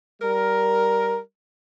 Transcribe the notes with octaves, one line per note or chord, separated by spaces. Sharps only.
G3 A#4